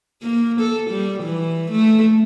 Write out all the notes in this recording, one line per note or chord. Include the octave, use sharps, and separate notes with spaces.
A#3
A4
G3
E3
A3